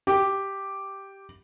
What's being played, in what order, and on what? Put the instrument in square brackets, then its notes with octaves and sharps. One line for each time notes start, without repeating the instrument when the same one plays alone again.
[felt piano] G4